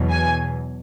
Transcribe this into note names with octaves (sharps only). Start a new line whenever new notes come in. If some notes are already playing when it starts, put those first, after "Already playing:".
Already playing: E2 B2 F#3
G#5